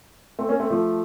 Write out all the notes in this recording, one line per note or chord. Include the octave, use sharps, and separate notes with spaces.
A3 C4
A#3 C#4
A3 C4
F3 A3